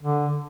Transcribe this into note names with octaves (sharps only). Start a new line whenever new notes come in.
D3